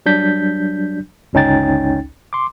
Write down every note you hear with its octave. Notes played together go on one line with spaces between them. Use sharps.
F#3 G3 D4 G6 B6
G1 C#2 C#4 D#4 G5 A6
C6 D6